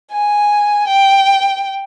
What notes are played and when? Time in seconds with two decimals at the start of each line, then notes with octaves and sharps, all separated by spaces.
0.12 G#5
0.87 G5